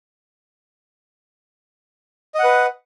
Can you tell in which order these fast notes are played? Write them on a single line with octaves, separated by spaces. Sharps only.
D#5 F#5 B4